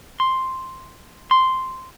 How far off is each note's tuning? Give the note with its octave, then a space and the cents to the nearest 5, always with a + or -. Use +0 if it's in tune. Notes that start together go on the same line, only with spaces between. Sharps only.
C6 +0
C6 -5